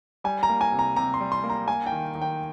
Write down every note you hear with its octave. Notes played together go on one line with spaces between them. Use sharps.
G3 G#5
A#5
A#3
G#5
C3
A#5
C3 A#5
C6
G3
C6
A#3
A#5
A#3 G#5
G5
D#3
D#3
G5